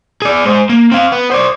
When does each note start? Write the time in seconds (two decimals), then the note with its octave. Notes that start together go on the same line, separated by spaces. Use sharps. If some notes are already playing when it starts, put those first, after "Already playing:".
0.22 G#4 D5
0.45 G#3 C5
0.70 A#3
0.92 C4 F5
1.12 B3
1.32 C5 D5